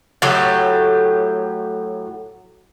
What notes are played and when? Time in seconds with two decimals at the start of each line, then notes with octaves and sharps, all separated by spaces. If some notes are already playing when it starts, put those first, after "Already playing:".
0.22 A2 F#3 G4